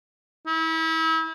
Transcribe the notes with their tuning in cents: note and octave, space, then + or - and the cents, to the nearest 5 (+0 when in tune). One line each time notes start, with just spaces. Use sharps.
E4 -35